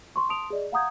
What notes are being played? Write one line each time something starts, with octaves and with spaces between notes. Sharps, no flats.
C6 C#6
A5 C6 D#6 D7 F7
G#4 D5 D#5
F5 F#5 A#5 D#6 G6 G#6